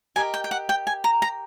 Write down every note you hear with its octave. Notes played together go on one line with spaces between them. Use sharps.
G4 A#4 D#5 G#5
G5
G5
F#5
G5
G#5
A#5
A#5